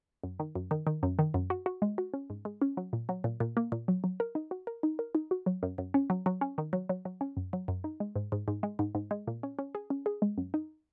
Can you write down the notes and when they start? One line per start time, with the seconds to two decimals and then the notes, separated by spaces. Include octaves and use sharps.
0.23 F#2
0.40 D#3
0.55 F#2
0.71 D#3
0.87 D#3
1.03 F#2
1.19 D#3
1.34 F#2
1.50 F#4
1.66 F#4
1.82 G#3
1.98 F#4
2.14 C#4
2.30 G#2
2.45 G#3
2.62 C#4
2.77 F#3
2.93 A#2
3.09 F#3
3.24 A#2
3.40 A#2
3.57 A#3
3.72 A#2
3.88 F#3
4.04 F#3
4.20 A#4
4.35 D#4
4.51 F#4
4.67 A#4
4.83 D#4
4.99 A#4
5.15 D#4
5.31 F#4
5.46 F#3
5.63 F#2
5.78 F#2
5.94 C#4
6.10 F#3
6.26 F#3
6.41 C#4
6.58 D#3
6.73 F#3
6.89 F#3
7.05 F#3
7.21 C#4
7.37 F#2
7.53 F#3
7.68 F#2
7.84 D#4
8.00 G#3
8.16 G#2
8.32 G#2
8.48 G#2
8.63 G#3
8.79 G#2
8.95 G#2
9.11 G#3
9.27 A#2
9.43 C#4
9.59 C#4
9.75 G#4
9.90 C#4
10.06 G#4
10.22 G#3
10.38 F#2
10.54 D#4